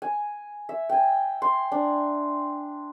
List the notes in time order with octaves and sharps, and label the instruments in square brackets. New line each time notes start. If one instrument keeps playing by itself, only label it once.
[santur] G#5
E5
G5 G#5
C6
D4